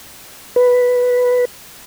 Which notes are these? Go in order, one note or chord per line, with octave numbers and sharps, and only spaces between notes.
B4